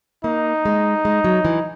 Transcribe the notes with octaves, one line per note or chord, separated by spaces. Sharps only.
A#3 D#4
G#3
G#3
F#3
E3